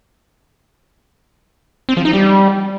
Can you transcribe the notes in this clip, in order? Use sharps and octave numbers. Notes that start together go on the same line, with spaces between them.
C4
F3
D#4
G3